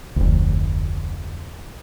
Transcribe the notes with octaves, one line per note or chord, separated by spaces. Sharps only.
F1 D2